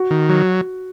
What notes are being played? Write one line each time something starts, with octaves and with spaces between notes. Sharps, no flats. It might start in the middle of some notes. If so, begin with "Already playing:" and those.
Already playing: F#4
D#3
F#3